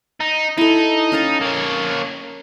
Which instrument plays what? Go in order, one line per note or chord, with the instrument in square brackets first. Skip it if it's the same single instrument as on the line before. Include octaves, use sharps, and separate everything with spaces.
[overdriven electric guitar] D#4
[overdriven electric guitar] D#4 [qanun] E4 A4
[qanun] C#4 F5 A5
[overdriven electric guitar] A#3 C#5